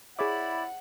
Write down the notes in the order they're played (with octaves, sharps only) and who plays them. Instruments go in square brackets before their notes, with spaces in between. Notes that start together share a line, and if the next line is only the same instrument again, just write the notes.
[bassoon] E4 [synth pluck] G#4 C#5 D6 [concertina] D5 B5 [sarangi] F#5